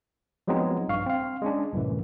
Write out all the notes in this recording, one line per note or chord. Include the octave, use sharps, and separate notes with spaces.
F3 F#3 G#3 B3 C4 D#4
A#1 G2 F5 C#6
C4 F5
G#3 C#4 D4
C2 F#2 A2 E3